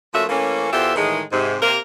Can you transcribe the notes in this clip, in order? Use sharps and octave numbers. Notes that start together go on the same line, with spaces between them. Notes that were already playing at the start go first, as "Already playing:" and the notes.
F3 A3 A#3 C#4 F#4 E5
E3 A3 A#3 C#4
E2 F4 G4 A4 C5 E5
A2 D#3 E3 G#3
G#2 C3
C3 A#3 A#4